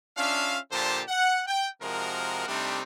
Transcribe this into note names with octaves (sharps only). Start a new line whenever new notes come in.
C#4 D4 F4 E5 F5
A#2 D3 F3 G4 C5 A5
F#5
G5
C3 F3 G#3 F#4 A#4
C3 G3 A3 C4 D4 D#4